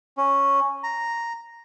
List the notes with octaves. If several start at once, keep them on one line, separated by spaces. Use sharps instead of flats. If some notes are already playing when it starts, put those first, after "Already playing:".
C#4
A#5